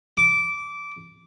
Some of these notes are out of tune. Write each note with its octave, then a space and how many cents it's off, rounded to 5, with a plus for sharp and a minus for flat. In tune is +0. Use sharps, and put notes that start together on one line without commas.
D6 -15